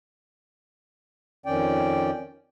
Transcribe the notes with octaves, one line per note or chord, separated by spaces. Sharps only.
F2 D#3 C#4 D5 G5